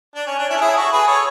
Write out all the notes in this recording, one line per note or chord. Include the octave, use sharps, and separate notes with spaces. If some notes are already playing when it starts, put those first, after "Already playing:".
D4
C#4
D4
C#4 E4
A4
E4 G#4
F#4 A4
G#4 B4
A4 C#5